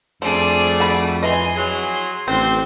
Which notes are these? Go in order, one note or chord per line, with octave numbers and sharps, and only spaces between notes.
F2 G3 A3 D4 G#4 C5
F#4 B5
E3 D#5 G#5 C6
F#3 G#4 C6
A1 D3 C4 C5 C6